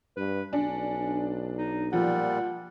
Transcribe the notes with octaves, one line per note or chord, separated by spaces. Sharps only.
G2 B4
B1 C#4 D4
D#4
A#2 F3 G3 F#5